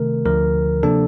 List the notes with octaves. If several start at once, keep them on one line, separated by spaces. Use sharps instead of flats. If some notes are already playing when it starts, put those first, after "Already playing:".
Already playing: C3 D#3 A3 A#4
D2 D3 F3 A#4
C3 F3 A#3 D4 A4